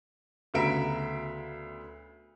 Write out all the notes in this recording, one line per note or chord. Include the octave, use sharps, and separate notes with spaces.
D2 C#3 B3 E5 A#5 D7